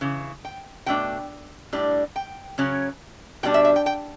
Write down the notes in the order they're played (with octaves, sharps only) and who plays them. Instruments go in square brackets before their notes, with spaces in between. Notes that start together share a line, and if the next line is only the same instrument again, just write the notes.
[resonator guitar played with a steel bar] C#3 E3
G5
B2 A3 D4 G5
A2 G3 D4
G5
C#3 F#3 C#4
B2 G3 D4 G5
E5
E5
G5
G5